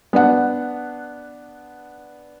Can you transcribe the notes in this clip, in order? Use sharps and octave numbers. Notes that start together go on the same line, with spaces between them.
B3 D4 F#5